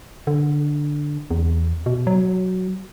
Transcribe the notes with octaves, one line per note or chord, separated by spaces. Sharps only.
D3
E2
B2
F#3